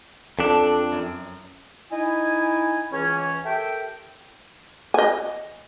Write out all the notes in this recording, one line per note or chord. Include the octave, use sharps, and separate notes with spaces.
F2 C4 D4 A4
F#2
D#4 E4 G#5
C#2 E3 C#4
G4 A4 A#4 E5 G5
D#5 G#5